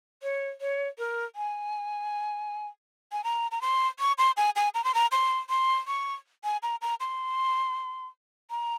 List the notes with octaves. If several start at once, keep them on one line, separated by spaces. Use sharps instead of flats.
C#5
C#5
A#4
G#5
G#5
A#5
A#5
C6
C#6
C6
G#5
G#5
A#5
C6
A#5
C6
C6
C#6
G#5
A#5
A#5
C6
A#5